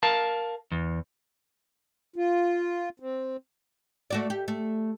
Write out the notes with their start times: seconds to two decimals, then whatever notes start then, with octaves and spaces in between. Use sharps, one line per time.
0.03 A#4 F5 A5
0.72 E2
2.16 F4
3.00 C4
4.10 A3 F#4 D5
4.30 G4
4.48 A3